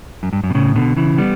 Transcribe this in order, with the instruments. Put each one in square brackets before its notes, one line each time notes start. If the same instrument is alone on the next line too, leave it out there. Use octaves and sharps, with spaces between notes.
[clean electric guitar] F#2
G2
F#2
B2
A2 C#3
B2 D3
C#3 E3
G3 B3